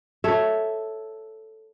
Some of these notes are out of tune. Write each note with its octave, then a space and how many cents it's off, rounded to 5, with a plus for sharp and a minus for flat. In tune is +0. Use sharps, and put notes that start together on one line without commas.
A4 +0 C#5 +5 E5 +0